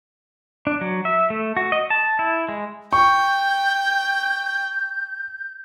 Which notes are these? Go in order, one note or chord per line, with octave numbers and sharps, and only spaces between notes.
D4
F#3
E5
A3
F#4
D#5
A5
E4
G#3
G5 C#6 G6